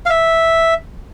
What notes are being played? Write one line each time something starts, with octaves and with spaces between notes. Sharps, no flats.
F5
E5